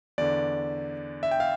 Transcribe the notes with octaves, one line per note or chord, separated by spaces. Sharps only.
E2 D3 D5
E5
G5
F5